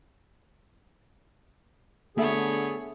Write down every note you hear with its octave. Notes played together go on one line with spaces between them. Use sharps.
D3 A3 B3 G#4 A4 C#5 E5